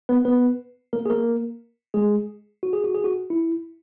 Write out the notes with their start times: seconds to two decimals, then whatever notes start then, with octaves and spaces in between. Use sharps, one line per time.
0.09 B3 B4
0.25 B3 B4
0.93 A#3 A#4
1.06 G#4
1.10 A#3 A#4
1.94 G#3 G#4
2.63 F#4
2.73 G#4
2.84 F#4
2.94 G#4
3.04 F#4
3.30 E4